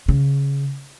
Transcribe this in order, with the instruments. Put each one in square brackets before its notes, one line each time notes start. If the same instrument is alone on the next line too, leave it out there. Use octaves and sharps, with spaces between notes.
[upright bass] C#3